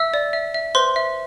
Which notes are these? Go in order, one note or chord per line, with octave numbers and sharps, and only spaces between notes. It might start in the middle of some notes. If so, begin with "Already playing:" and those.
Already playing: E5 E6
D5
E5
E5
B4 C5 C6
E5